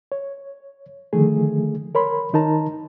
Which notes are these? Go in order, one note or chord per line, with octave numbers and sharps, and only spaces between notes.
C#5
D3 D#3 F3 A3 G#4
A#4 C#5 B5 C6
D#3 D#4 A#4 A5 A#5